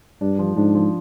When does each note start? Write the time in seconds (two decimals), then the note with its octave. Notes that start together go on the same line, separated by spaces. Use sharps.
0.21 G2 D4
0.39 F3
0.57 G#2 D4
0.75 F3